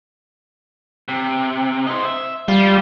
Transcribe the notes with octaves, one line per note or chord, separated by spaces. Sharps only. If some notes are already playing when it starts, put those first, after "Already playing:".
C3
C5 D#5
E5
G3 F4